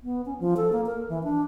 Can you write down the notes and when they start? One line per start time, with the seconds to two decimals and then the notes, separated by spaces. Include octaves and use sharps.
0.04 B3
0.26 C#4
0.40 F3
0.57 A4
0.73 A#3
0.86 A#4
1.09 E3
1.24 D4